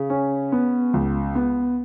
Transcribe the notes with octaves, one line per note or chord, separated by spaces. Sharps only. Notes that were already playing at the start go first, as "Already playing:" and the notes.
Already playing: C#3
C#4
B3
C#2
B3